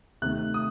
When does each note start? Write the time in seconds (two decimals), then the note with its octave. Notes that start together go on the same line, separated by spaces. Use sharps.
0.22 C3 D#3 A3 C4 F#6
0.54 D#6